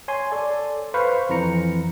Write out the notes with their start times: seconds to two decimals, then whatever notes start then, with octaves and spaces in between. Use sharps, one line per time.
0.08 C#5 G#5 C6
0.32 A4 D5
0.94 B4 C5 F5 B5 C#6
1.29 F2 E3 A#5 C#7